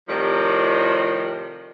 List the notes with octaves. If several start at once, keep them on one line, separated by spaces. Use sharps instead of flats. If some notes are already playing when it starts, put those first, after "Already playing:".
A2 C3 D#3 F3 G3